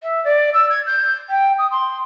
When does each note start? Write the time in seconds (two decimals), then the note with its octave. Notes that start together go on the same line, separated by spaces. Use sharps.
0.02 E5
0.24 D5
0.53 E6
0.70 G#6
0.86 G6
1.29 G5
1.58 D#6
1.71 C6